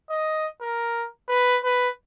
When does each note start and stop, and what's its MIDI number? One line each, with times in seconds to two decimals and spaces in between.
0.10 0.47 75
0.61 1.07 70
1.28 1.58 71
1.64 1.89 71